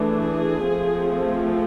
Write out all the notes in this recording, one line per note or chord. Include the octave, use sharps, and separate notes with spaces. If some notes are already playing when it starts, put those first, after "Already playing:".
Already playing: E3 A3 D4 G#4
F3 A3 C4